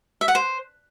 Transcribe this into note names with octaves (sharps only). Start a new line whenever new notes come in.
E5
F#5
C5